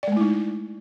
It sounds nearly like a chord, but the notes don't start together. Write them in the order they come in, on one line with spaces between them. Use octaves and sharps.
D5 G#3 A3 E4 D#4